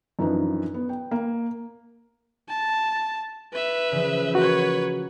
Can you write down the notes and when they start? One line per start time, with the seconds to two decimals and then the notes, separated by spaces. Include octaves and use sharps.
0.19 F#2 E3 F3 D4 D#4
0.74 B3
0.89 G5
1.11 A#3
2.48 A5
3.52 B4 E5
3.92 C#3 E3 F3
4.35 A#3 F#4 B4 C#5